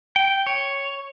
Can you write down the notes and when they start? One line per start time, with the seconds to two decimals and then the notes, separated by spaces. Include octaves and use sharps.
0.16 G5
0.46 C#5